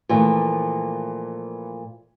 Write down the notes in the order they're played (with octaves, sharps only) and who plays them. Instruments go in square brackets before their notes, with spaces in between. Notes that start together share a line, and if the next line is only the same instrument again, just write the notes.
[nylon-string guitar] A#2 F3 A3 [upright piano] E3